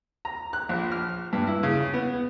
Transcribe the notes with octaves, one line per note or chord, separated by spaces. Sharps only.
A#5
F#6
A#1
F6
G2
E4
C#3
B3